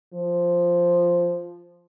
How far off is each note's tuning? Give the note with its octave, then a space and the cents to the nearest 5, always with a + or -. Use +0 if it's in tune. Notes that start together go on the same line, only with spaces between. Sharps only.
F3 +0